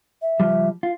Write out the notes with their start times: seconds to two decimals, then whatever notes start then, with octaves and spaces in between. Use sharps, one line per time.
0.22 E5
0.40 C#2 F3 G3
0.83 F4